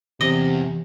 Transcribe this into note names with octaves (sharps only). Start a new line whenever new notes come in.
E2 C3 D#5